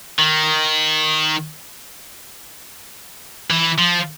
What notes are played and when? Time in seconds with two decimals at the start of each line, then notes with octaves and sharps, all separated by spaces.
0.19 D#3
3.50 E3
3.78 F3